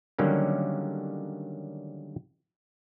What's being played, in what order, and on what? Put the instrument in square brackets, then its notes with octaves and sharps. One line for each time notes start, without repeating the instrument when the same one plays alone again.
[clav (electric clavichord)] D3 D#3 F#3 G3 A#3 C#4